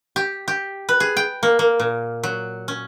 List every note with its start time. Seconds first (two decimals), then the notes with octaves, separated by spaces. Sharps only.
0.16 G4
0.48 G4
0.89 B4
1.00 G#4
1.17 G5
1.43 A#3
1.59 A#3
1.80 A#2
2.23 F#3
2.68 C#4